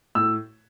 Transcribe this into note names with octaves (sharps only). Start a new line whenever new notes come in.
A2 E6